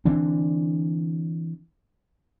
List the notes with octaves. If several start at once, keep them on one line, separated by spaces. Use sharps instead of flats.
D3 E3 C4 D4